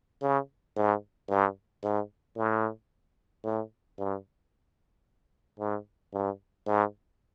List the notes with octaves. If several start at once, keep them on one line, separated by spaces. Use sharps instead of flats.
C#3
G#2
G2
G#2
A2
A2
G2
G#2
G2
G#2